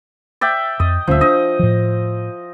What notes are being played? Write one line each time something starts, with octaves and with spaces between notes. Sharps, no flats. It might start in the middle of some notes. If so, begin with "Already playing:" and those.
D5 E5 G5
F2 D#5
D#1 D2 F3 C#4 E5
D4 D#5
A2 F3